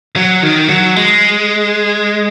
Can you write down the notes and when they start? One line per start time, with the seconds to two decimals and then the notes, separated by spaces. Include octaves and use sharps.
0.16 F#3
0.43 D#3
0.69 F#3
0.97 G#3